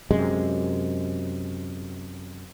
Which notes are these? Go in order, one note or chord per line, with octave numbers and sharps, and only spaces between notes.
F#2 C3 G#3